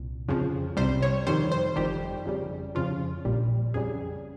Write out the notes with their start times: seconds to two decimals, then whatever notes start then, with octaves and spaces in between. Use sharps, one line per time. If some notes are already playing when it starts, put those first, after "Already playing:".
Already playing: C2 A#2
0.29 F2 C#3 F3
0.77 C2 C3 G3 C5
1.02 C#5
1.27 F2 D#3 G3 C5
1.52 C5
1.76 G1 F2 D#3 G3 G4
2.26 F2 C#3 G3
2.75 F2 C#3 F3 F4
3.25 A#1 A#2 G3
3.74 F2 C#3 G3 G#4